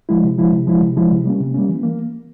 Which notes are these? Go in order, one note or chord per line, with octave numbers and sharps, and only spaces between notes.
F3 G#3 E4
C3
F3 G#3 E4
C3
F3 G#3 E4
C3
F3 G#3 E4
C3
G3 A#3 C#4
C3
G3 A#3 C#4
E3
A#3